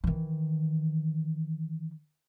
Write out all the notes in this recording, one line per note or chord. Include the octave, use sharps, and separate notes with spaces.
D#3 E3